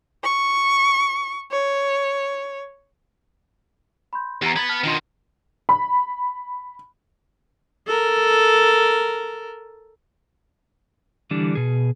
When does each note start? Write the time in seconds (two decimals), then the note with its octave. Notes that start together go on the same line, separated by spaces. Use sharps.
0.24 C#6
1.52 C#5
4.13 B5 C6 G6
4.42 E2 G4 A#5
4.56 B3 B5 G#6 A6
4.69 A5 F6
4.84 B2 D#3 D4 F4 C6
5.69 B5
7.87 A4 A#4
11.31 D3 E3 G3 D4
11.55 B2 G#4